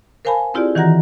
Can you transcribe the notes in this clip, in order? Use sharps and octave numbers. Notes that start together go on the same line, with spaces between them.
A#4 C5 F5 G#5 A5 B5
C4 E4 F4 G4 G#4 D5
D#3 E3 F#4 F#5 A#5 A#6